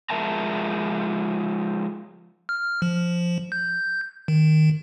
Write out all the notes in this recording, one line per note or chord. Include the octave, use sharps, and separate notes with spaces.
F3 G#3 A#4 E5 A5 A#5
F6
F3
G6
D#3